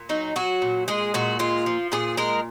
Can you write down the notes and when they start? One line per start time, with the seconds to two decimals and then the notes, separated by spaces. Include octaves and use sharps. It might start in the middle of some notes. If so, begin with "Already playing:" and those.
Already playing: A#2
0.09 F#3 D#4
0.36 F#3 F#4
0.62 A#2
0.88 G#3 G#4
1.14 A#2 F#4
1.39 G#3 F4
1.66 F3
1.92 A#2 G#4
2.17 G#3 A#4